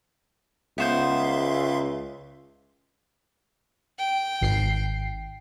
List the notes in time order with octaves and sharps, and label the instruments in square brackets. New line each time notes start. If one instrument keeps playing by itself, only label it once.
[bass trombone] C#2 [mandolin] B3 C5 G6 [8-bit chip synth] E5 F5 C6
[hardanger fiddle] G5
[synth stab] G#1 C7